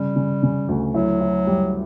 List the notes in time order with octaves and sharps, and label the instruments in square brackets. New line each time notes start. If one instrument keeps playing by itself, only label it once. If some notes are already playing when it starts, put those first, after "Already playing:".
Already playing: [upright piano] C#3 [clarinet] G3
[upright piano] C#3
C#3
D2
[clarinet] F#3 [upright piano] E4
[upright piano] E4
G3